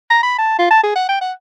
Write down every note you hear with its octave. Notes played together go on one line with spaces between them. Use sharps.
A#5
B5
A5
F4
A5
G#4
F#5
G5
F#5